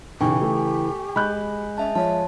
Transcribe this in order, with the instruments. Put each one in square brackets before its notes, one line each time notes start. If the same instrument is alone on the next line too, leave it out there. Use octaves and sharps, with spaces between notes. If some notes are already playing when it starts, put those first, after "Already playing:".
[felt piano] B1 [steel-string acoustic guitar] C#3 E3 [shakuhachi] G4 [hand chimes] G5 G#5 C#6
[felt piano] A3
[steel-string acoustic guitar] G#3 [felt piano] B5 F#6 G6
[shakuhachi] C#4 [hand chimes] D#5 E5 A5
[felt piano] F3 [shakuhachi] C#5 [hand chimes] A5